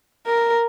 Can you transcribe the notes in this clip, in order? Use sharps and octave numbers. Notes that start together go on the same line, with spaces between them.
A#4